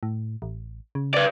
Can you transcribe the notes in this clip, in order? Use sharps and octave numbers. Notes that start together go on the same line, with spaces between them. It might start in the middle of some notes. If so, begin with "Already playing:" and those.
A2
A1
C#3
B4 D5